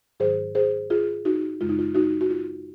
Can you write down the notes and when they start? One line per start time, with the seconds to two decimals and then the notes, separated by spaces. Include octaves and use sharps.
0.20 G#2 D#3 F#3 G#4 C5
0.55 G#4 C5
0.90 F4 G#4
1.25 D#4 F#4
1.61 F#2 C#3 G#3 F4
1.69 D#4
1.79 F4
1.95 D#4 F#4
2.21 F#4
2.30 F4